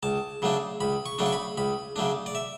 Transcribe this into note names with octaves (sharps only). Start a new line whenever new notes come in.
C#2 A5
C#3 F#3 A3 D4
C#2 B5
C#6
C#3 F#3 A3 D4
C#6
B5
C#2 B5
C#3 F#3 A3 D4
D5
E5